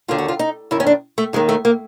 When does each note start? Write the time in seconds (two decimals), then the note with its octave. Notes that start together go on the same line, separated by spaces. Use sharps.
0.08 D#2 D3 F4
0.18 F#4
0.28 F4
0.39 D#4
0.71 F#2 D#3 E4
0.80 C#4
0.87 D4
1.18 A3
1.33 D#2 D#3 G#3
1.49 A3
1.65 A#3